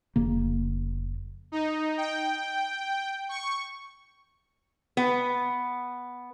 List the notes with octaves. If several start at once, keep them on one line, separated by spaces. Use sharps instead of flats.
F1 C#3 A#3
D#4
G5
C#6
B3